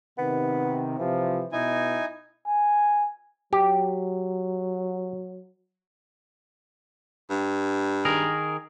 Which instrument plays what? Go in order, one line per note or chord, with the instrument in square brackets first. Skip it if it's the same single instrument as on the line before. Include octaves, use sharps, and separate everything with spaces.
[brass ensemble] C3 D#3 [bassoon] B3
[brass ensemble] C3 F3 [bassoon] E3
[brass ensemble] B2 [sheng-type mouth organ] D#4 G#5 [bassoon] E4
[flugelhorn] G#5
[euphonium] F#3 [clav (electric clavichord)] G4
[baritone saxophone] G2
[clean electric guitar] D#3 G#4 A#4